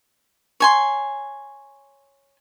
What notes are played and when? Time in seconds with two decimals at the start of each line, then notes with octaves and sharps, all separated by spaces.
0.60 C#5 G#5 C6